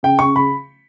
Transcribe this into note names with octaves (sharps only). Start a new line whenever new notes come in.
C#3 G5
C#3 C#6
C#3 B5